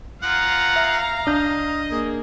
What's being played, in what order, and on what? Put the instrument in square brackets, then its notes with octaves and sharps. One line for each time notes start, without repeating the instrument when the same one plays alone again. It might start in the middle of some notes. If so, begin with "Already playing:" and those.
[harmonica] F3 F#5 [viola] F5 A#5
[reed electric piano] E5
[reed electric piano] C2 D4 G6 [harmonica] D#5
[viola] A#3 G#4